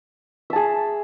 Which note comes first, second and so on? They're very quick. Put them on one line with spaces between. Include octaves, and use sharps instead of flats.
E5 A5 G#4